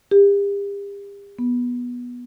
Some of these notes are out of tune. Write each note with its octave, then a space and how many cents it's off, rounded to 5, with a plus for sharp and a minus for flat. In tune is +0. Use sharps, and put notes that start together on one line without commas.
G4 +40
B3 -15